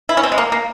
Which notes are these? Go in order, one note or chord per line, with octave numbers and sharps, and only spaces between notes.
E4
C#4
C4
G#3
A#3
A#3